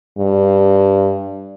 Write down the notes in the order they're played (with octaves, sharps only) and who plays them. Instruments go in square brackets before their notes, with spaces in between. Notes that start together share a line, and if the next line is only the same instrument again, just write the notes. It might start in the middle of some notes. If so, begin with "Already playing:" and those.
[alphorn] G2